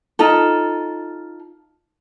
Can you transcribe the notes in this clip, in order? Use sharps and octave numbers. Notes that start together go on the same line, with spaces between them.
D#4 F4 A4